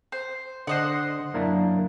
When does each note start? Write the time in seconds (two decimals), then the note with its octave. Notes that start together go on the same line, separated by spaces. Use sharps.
0.12 C5
0.67 D3 C5 D#5 F#5
1.34 F#2 A#3 D4 E4